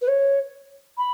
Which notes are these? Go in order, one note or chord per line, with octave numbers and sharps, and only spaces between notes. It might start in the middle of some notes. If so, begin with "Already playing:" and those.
B4
C#5
B5